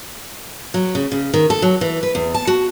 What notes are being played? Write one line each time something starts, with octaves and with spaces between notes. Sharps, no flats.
F#3
C#3
C#3
D#3
A4
F#3
E3
B4
E2
A5
F#4